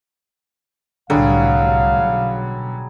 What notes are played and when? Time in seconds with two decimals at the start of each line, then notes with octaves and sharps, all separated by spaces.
1.10 C2 A2 D3 F#3 G3 G#4 F5
2.00 B1